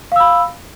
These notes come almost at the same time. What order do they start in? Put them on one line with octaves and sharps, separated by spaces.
F5 E6 B5